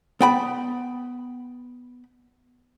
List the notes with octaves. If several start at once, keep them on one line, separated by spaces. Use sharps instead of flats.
B3 G5 B5